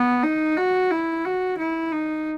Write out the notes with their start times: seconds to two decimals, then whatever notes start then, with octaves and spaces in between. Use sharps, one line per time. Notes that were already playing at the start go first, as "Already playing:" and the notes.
Already playing: B3
0.23 D#4
0.57 F#4
0.90 E4
1.25 F#4
1.58 E4
1.92 D#4